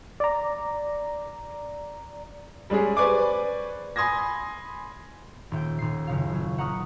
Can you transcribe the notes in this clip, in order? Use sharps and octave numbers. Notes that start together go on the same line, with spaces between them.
D5 A#5
G3 G#3 C#4 G#4
B4 C5 D5 G#5 C#6 D6
G#5 B5 C6 D#6 G#6 A#6
D#1 E5 G5
D#1 C7
F#1 C#3 F5
F#3
E5 F#5 A#5 C#6 D#6 F6